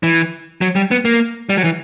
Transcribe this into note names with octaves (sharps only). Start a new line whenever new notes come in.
E3
F#3
G3
B3
A#3
G3
F#3
E3